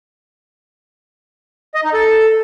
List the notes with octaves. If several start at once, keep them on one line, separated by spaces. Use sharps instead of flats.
D#5
D#4
A4